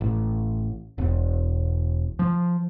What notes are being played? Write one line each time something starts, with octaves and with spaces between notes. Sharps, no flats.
A1
E1
F3